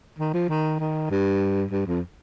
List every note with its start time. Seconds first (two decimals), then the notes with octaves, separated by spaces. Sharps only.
0.19 D#3
0.34 F3
0.49 D#3
0.80 D#3
1.10 G2
1.71 G2
1.86 F2